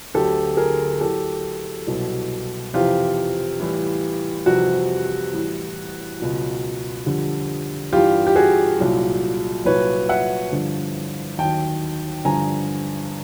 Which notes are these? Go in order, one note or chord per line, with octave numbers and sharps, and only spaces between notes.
D2 D3 F#3 G4 A4
G#4 A#4
A2 F#3 G4 A4
C2 B2 F#3
F2 C3 E3 F4 G4
A2 E3 G3
F2 C3 E3 G3 F#4
A2 E3 G3
C#2 B2 F#3
F2 D3 G3
G2 E3 G3 F4 G4
G4
F#4 G#4
C2 A#2 F#3
C2 A#2 F#3 B4 C#5
E5 F#5
G2 D3 F3
D#2 D#3 F#3 G5 A5
G2 D3 F3 G#5 A#5